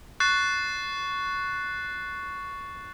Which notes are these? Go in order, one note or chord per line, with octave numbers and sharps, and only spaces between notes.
C#6 F#6 A6 C7